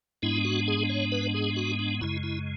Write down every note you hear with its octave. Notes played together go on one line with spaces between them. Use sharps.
G#2 G#3 B3 D4 E4
F#4
G#4
C#5
B4
G#4
F#4
D4
F#2 C#3 G#3 E4
E4